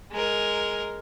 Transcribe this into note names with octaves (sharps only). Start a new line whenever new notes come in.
G#3 A#4